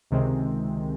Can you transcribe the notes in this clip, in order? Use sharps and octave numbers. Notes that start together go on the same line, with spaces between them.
C#2 C3 D#3 G#3 C4